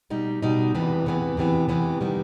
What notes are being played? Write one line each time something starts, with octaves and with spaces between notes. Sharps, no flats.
B2 G3 D#4
B2 G3 D#4
E2 C3 E3 B3
E2 C3 E3 B3
E2 C3 E3 B3
E2 C3 E3 B3
D#3 G3 B3